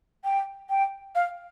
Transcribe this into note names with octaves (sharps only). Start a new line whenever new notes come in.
G5
G5
F5